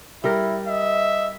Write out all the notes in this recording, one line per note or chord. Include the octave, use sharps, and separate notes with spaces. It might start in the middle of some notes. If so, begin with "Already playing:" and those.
G3 E4 G4 A#4
D#5 E5